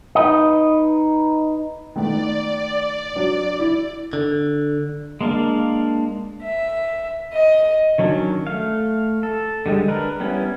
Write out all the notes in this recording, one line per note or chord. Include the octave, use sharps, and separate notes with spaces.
D#4 B4 D#5
D#3 A3 B3 D5
F#3 D4
E4 D5
D3
G#3 A#3 D4 F5
E5
D#5
D#3 F#3 C#4 D4
A3 F5
A4
D3 G3 G#3
D4 A#4 B4
G3 B3 C#4 E4